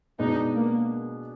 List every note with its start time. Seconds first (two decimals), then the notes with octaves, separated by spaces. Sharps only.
0.19 B2 G#3 B3 D4 D#4
0.55 A#3